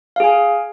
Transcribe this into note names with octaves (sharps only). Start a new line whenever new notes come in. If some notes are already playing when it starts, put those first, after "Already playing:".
G#4 F5 G#5